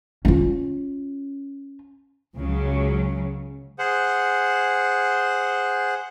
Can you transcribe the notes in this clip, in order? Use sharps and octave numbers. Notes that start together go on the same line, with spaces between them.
C#4 F4
C#2 C#3 F#3
G#4 C5 F#5